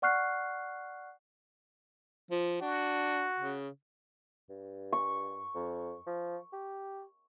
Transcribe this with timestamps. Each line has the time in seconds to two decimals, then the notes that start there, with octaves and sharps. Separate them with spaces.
0.02 D5 F#5 C#6 F6 F#6 C7
2.31 F3
2.61 D4 F#4
3.39 C#3
4.49 G2
4.93 C#6
5.55 F2
6.07 F3
6.53 G4